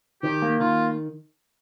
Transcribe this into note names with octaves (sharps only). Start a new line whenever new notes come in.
D#3 G4
A#3
D#3 F4